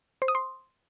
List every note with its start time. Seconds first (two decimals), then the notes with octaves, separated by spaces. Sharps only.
0.22 C5
0.28 D#6
0.35 C6